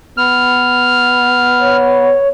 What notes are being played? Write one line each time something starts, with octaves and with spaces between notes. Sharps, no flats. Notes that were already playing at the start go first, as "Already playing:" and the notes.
B3 F6
C#5